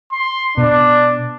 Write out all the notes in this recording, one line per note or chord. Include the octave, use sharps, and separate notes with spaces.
C6
B2 D4